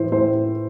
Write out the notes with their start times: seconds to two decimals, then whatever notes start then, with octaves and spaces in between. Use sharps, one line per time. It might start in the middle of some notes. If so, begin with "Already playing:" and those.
Already playing: A2 E3 C5
0.12 A2 C5